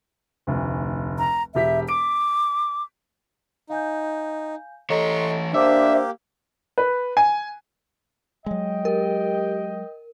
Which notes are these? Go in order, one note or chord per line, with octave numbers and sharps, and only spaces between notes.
F1 D2
A#5
E1 G4 E5 B6
D6 D7
D#4 F5 G#5 G6
E3 A4 C#5 D#5 A#5 C6 C#6
A#3 D4 G4 C5 E5 D6 E6
B4
G#5
F#3 G#3 D#5 G5
G4 A#4